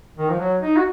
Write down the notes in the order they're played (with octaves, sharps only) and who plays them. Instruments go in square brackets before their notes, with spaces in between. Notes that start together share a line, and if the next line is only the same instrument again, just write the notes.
[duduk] D#3
F3
F#3
D#4
F#4